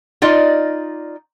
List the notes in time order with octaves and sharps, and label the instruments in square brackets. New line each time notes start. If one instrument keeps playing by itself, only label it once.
[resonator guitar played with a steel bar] D#4 F4 D5 D#5